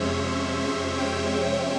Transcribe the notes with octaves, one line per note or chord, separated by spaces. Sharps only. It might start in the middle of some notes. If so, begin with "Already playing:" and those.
Already playing: F2 C3 F3 G#3 C#4 C5 C#5 E5
C5 E5
E5 G5